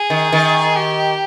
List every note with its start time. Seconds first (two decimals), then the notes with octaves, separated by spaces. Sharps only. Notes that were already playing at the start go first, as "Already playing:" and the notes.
Already playing: G#4
0.10 D#3
0.32 D#3
0.76 G4